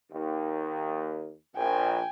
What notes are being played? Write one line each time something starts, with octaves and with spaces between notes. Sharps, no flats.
D#2
A#1 G5 G#5